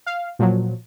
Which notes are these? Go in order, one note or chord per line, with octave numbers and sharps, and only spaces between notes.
F5
A#2 F3 F#3